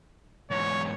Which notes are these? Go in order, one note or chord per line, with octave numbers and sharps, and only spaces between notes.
E2 G#2 C#5